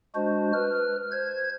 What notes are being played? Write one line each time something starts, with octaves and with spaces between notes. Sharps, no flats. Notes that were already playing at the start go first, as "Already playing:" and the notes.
G#3 D4 F#4 C5
B4 F6
C5 G#6